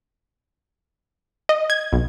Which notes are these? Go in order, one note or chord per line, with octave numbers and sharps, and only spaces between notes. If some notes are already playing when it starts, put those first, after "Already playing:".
D#5
G#6
B1